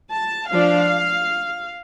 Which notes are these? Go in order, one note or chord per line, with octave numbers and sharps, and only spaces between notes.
A5
F3 D4 F5